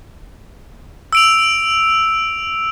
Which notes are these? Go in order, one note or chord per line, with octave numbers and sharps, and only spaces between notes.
E6 D7 F7